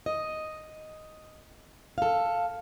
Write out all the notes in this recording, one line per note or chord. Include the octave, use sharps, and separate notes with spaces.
D#5
A4 F5